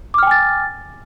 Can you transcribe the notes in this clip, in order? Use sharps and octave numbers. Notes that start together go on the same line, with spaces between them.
G5 G#5 D6 F6 A6